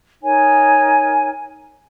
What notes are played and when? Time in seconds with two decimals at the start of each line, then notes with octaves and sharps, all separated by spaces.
0.22 D#4 A#4 C#5 G#5